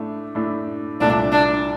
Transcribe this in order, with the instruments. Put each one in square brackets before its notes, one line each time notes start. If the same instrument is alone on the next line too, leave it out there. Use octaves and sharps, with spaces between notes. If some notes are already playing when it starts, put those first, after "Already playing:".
Already playing: [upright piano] A2 A3 D4
A2 A3 D4
[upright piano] C2 A#2 A3 [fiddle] D4
[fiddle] D4